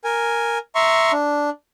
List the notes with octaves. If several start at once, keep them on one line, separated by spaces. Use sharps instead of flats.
A#4 G#5
E5 A#5 C6 C#6
D4